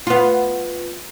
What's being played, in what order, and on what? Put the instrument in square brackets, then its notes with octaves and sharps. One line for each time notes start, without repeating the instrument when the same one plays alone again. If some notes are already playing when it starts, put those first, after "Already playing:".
[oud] B3 F4